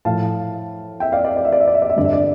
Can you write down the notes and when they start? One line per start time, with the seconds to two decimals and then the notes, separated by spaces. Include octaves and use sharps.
0.05 A2 F3 F5 A5
1.00 E5 G5
1.12 D5 F5
1.25 D5
1.37 D5
1.45 E5
1.52 D5
1.60 E5
1.68 D5
1.74 E5
1.82 D5
1.90 E5
1.96 G2 D3 G3 D5
2.05 E5
2.13 D5